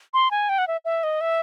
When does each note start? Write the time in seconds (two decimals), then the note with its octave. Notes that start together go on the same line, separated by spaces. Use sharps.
0.14 C6
0.31 G#5
0.49 G5
0.58 F#5
0.68 E5
0.85 E5
1.03 D#5
1.21 E5